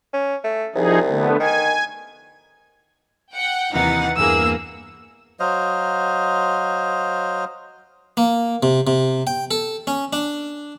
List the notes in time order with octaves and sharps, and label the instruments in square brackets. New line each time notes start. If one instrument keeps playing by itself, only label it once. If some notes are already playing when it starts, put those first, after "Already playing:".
[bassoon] C#4
A3
[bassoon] C2 [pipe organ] F3 D#4 G#4
[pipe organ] D3 A3 B3
[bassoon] D#3 [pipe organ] G#5
[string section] F#5 G5
[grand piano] D#2 C3 [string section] E3 D#4 A6 [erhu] F#5
[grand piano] E2 G2 B4 [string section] A#3 G#4 [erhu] E6
[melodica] F#3 C5 D#5 F5
[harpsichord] A#3
C3
C3
G5
A4
C#4
D4